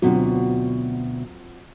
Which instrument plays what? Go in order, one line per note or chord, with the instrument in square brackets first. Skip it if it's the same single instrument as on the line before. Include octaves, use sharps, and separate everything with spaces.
[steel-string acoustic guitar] D2 B2 [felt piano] F#3 C4 F4